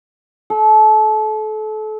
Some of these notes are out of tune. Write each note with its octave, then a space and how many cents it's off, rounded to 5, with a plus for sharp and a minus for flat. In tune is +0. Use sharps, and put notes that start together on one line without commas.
A4 -30